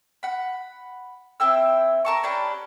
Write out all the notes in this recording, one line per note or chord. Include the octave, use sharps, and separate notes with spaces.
F#5 B5
C4 E4 G5 E6
A#4 A5 C#6
C#4 D4 G4 B4